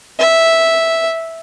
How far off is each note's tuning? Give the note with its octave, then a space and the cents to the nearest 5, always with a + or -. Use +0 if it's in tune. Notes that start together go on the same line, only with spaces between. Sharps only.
E5 -5